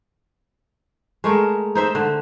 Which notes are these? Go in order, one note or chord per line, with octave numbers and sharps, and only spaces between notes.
G#3 A3 A#4
D#4 C5 E5
D3